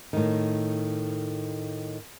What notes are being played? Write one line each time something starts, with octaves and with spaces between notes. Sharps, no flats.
A2 D#3